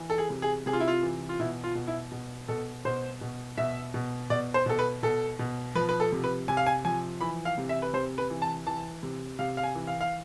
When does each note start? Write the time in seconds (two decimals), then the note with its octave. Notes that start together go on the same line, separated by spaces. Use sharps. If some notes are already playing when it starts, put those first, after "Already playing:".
Already playing: E3
0.10 A4
0.18 G#4
0.30 C3
0.42 G#4
0.66 C3 G#4
0.73 F4
0.80 E4
0.88 F4
1.03 E3
1.29 F4
1.39 B2 E4
1.64 F4
1.75 B2
1.87 E4
2.12 B2
2.48 B2 A4
2.85 B2 C5
3.21 B2
3.58 B2 E5
3.94 B2
4.30 B2 D5
4.54 C5
4.66 B2 A4
4.79 B4
5.03 B2 A4
5.39 B2
5.75 F3 B4
5.89 B4
6.00 A4
6.12 C3
6.24 B4
6.48 C3 G#5
6.57 F5
6.66 G#5
6.85 F3 G#5
7.21 E3 B5
7.45 F5
7.58 C3
7.69 E5
7.82 B4
7.93 C3 C5
8.18 B4
8.30 E3
8.42 A5
8.67 E3 A5
9.03 C3
9.39 C3 F5
9.57 F5
9.63 G#5
9.75 E3
9.87 F5
10.01 F5